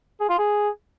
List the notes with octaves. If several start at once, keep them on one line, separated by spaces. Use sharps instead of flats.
G#4
F4
G#4